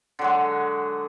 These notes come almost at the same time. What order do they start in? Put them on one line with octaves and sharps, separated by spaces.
D3 F#3 G#3